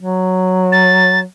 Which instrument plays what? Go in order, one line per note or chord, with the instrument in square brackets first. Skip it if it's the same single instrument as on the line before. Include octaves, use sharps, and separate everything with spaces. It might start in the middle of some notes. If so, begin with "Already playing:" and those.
[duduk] F#3
[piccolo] A6